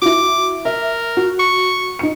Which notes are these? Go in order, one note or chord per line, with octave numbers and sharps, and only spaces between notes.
E4 F#4 D6
A#4 E5
F#4
C#6
D#4 C#7